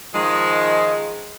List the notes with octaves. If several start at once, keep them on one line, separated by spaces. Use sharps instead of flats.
D#3 F3 G#3